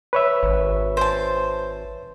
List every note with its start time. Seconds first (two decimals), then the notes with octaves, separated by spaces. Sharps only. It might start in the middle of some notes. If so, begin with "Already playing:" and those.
0.13 B4 C#5 E5
0.43 G#1
0.97 C5 A5